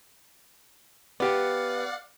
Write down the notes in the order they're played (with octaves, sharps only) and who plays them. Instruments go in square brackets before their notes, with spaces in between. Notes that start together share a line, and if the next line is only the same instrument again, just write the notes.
[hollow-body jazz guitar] B3 G4 [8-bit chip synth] D5 F5 F#5